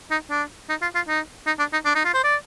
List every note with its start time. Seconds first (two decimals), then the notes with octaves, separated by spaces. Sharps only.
0.11 D#4
0.31 D4
0.69 D#4
0.82 F4
0.95 F4
1.08 D#4
1.47 D#4
1.59 D4
1.73 D#4
1.85 D4
1.95 D#4
2.05 F4
2.14 C5
2.24 D5